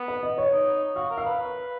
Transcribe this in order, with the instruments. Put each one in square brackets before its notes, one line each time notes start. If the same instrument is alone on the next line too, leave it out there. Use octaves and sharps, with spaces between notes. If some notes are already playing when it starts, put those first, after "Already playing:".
Already playing: [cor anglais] B3
[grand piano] B4
D#5
C#5
[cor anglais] D#4
[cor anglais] F#4 [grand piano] F5
[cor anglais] A#4
[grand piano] F5
[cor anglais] B4